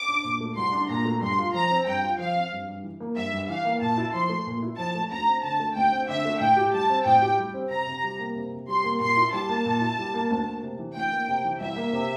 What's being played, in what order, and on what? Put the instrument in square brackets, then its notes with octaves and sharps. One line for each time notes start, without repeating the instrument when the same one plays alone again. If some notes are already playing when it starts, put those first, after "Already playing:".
Already playing: [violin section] D6
[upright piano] D4
A#2
A3
[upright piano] C2 [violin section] C6
[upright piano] D4
[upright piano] A#2 [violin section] A#5
[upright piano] A3
[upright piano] G2 [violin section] C6
[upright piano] F4
[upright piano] F3 [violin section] A#5
[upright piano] C4
[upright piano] G2 [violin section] G5
[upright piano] F4
[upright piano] F3 [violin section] F5
[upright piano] C4
G2
G2
E3
A#3
[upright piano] G2 [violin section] E5
[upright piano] G2
[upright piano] E3 [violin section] F5
[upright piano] A#3
[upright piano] A#2 [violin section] A5
[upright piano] E4
[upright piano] F3 [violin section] C6
[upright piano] A3
A#2
E4
[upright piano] F3 [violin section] A5
[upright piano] A3
[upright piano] D2 [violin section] A#5
[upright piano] C4
[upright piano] D3 [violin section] A5
[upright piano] A3
[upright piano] D2 [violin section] G5
[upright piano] C4
[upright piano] D3 [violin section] E5
[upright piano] A3
[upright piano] A2 [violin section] G5
[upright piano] G4
[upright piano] G3 [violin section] A5
[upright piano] C4
[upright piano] A2 [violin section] G5
[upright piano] G4
G3
C4
[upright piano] C3 [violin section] A#5
[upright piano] C3
G3
A#3
C3
C3
[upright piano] G3 [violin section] C6
[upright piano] A#3
[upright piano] A#2 [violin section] C6
[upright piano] E4
[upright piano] G3 [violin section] A5
[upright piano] A#3
A#2
E4
G3
A#3
D2
A#3
C3
E3
[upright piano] D2 [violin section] G5
[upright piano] A#3
C3
E3
[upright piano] C2 [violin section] E5
[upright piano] A#3
C3